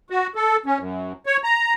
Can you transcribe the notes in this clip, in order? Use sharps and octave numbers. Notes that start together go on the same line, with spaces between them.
F#4
A4
C#4
F#2
C#5
A#5